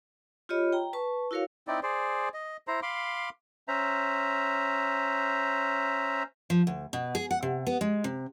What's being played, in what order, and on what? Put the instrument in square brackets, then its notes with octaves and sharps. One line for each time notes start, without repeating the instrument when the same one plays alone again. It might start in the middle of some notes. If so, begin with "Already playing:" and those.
[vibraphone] F4 G4 C#5 D#5 B5
G5 A#5
B4 A5 C#6
E4 F#4 A#4 C#5 F5
[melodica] C4 D#4 E4 D5
G#4 C5 D5
D#5
E4 C5 A#5
F5 B5 C6 D6
[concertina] C#4 C5 E5 A#5
[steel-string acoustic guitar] F3
D2
B2
G#4
F#5
C3
B3
G#3
C3